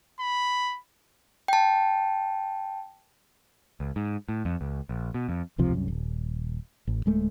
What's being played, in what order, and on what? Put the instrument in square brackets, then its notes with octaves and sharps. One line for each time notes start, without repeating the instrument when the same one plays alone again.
[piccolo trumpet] B5
[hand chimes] G5 A5
[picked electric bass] C#2
G#2
A2
F2
C#2
A#1
B2
F2
[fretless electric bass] E1 C#2 C3 F3
C2 F#2
D#1
A1
D1 G#3 A3